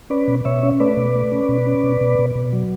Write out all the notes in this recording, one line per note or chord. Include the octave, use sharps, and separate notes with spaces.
C#4 B4 D5
B2
B2 C#5 E5
C#4
A3 B4 D5
B2
A3
C#4
B2
C#4
B2
B2
B2
B2
F#3